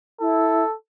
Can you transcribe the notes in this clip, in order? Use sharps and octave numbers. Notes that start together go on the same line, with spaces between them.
E4 A4